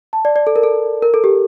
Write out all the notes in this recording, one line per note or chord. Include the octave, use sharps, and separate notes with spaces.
A5
D5
D5
A4
A#4
A4
A#4
A4
G4